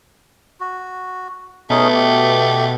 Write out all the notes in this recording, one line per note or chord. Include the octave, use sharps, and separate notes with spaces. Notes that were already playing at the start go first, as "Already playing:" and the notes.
F#4
B2 A3 C#4 D#4 G#4
G4